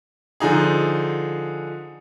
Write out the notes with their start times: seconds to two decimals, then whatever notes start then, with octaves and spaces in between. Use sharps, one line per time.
0.40 D3 F3 D#4 G#4